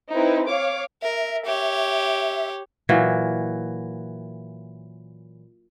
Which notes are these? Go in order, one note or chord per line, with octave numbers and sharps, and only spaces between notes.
C4 D#4 E4 B4
C#5 F5 D6
A#4 E5
G4 C#5
A#2 E3 F#3